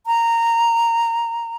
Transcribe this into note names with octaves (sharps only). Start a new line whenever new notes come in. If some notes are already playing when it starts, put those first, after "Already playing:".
A#5